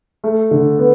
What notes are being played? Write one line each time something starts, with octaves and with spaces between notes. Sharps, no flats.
A3
D3
B3